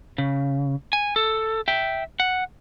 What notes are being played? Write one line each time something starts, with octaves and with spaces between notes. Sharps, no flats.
C#3
G#5
A4
E5 G5
F#5